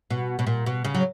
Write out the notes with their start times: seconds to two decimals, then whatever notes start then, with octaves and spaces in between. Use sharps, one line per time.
0.10 B2
0.39 B2
0.47 A#2
0.66 B2
0.84 C#3
0.95 F#3